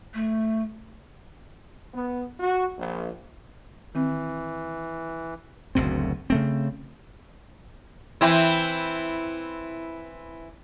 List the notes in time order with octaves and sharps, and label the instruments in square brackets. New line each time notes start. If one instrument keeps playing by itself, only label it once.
[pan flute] A3
[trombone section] B3
F#4
A#1
[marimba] D#3 C4 [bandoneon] E3
[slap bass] F#1 D2 B2 C4
C#3 A3 C4
[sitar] E3 C4 E4